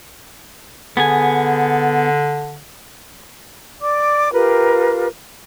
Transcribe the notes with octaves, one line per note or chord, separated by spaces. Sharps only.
D3 B3 G#4 G#5
D5 D6
F4 G4 A#4 B4